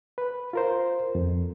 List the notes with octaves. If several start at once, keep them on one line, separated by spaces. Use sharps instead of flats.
B4
F4 A#4 C5
F2